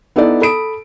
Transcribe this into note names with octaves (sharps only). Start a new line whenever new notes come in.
B3 D#4 E4 A4 D5
A4 B5 D#6 D7